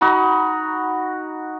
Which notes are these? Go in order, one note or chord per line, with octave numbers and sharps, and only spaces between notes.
D#4 F#4 A#5 B5